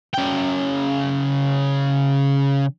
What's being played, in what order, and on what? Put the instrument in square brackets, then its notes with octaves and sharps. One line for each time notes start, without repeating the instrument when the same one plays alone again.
[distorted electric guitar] C#3 G5